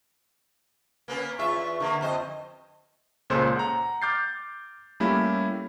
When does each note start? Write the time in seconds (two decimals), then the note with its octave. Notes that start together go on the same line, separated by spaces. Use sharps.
1.08 A#3 B3 C#4
1.39 E2 F4 E5 C#6
1.80 D3 A#3
2.01 F2 C5 D#5
3.30 C#2 A#2 C#3 A4 C5
3.55 F#5 A#5
4.02 D6 F6 G6 A6 C7
5.00 G3 A3 A#3 C#4 E4 G4